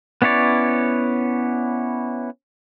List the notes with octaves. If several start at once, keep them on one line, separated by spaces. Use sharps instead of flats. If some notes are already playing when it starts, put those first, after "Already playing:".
B3 C#4 E4 C#5 D5